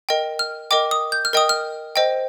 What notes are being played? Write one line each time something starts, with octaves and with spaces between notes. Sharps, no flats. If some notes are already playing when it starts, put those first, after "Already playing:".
A#4 D#5 G5
F6
A#4 D#5 G5 D6
D#6
G6
F6
A#4 D#5 G5 D#6
F6
C5 D#5 G5